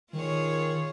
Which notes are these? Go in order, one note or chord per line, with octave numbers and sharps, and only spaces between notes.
D#3 F4 G#4 C#5